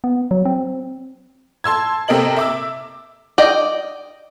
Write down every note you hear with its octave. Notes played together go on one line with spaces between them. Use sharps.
B3
F#3
C4
A5 C6 E6 G#6
C3 C4 A4 A#4 D#5 F#7
E5 D6 E6
D5 D#5 G5